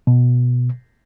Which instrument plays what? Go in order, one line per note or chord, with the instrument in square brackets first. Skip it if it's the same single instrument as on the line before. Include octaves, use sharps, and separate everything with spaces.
[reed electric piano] B2